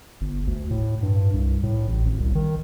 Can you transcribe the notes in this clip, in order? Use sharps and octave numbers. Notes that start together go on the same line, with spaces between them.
G1
D2
A2
G2
C2
A2
A1
G#1
C2
D#3